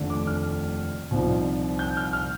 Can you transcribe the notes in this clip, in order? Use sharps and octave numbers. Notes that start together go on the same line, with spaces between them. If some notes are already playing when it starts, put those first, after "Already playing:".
Already playing: F1 D#2 D3 A3 D4
D6
F6
C2 A#2 F3 C4 D#4
G6
F6
F6